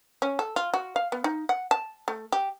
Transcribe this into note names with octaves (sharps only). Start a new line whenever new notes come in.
C#4
A4
F4
F#4
F5
B3
D#4
F#5
A5
A3
G4